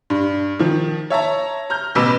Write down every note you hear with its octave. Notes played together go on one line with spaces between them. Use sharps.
G2
D#3 F3
C#5 E5 A5 A#5
A#5 F6 G6
A1 B2 B4 B5 D6 E6